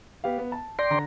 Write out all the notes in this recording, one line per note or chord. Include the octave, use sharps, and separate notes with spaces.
B3 G4 F5
B3
A5
D5 G5 C6 A#6
D3 A#5 A#6